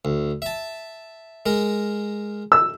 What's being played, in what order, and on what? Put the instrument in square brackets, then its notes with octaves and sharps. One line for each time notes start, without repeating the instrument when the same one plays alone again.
[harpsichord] D2
E5 A5
G#3 A#4
[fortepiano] E6